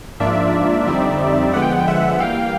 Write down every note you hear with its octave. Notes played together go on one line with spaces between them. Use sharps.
G#2 F3 A#3 D4 F4 D5 E5
F2 D3 G3 C4 D#4
D3 F3 G#3 B3 F#5
G5
F#5
G5
E5 F#5
E3 G3 A#3 F5 G5